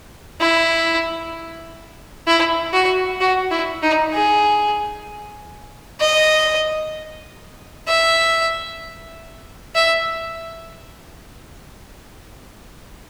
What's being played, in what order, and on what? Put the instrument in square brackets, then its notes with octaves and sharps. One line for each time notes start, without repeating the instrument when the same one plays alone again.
[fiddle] E4
E4
F#4
F#4
E4
D#4
G#4
D#5
E5
E5